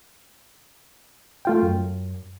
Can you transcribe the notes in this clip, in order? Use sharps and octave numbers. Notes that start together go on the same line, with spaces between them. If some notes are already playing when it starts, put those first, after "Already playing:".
A3 F4 G5
F#2